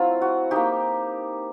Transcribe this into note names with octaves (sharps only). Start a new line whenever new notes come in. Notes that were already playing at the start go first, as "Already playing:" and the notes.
Already playing: F#3 A3 C4 E4 F4
F#4
A#3 D#4 G4